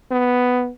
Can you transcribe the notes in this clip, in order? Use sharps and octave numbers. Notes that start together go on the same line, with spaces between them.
B3